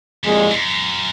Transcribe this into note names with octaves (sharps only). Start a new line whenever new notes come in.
C2 F2 A#2 G#3
G#2
F#2